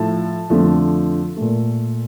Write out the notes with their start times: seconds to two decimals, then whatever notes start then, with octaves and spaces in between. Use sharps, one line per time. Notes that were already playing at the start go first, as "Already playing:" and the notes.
Already playing: A2 F3 A3 A5
0.50 F2 D3 F3 A3
1.37 A#2 A3